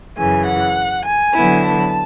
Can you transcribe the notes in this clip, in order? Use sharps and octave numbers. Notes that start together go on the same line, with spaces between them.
F#2 C#3 E3 G#5
F#5
G#5
D3 F#3 B3 E4
A5